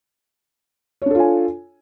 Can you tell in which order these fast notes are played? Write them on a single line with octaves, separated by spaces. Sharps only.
C#5 D4 A4 F4 G#5